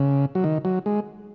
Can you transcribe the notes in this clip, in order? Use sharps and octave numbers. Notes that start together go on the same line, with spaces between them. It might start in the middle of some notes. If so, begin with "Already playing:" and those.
Already playing: C#3
F#3
D#3
F#3
G#3